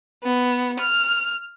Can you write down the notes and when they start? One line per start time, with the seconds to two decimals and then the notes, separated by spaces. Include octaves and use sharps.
0.24 B3
0.79 F6